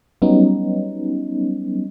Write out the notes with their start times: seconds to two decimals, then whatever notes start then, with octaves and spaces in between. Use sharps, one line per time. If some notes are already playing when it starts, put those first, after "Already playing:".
0.22 F#3 G3 B3 C#4 D#4